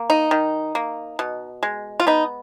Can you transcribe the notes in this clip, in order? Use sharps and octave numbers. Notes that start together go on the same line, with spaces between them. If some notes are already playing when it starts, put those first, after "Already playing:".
Already playing: A#3
D#4
D#3
A#3
B2
G#3
F4
B3 D#4